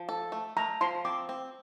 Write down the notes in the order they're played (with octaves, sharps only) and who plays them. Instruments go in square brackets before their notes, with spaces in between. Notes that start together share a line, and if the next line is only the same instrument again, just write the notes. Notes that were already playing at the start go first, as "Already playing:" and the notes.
Already playing: [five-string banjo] F3
A4
A3
[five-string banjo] A3 [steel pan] A#5
[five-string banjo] F3 [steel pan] C6
[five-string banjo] C4 [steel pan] D6
[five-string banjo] C4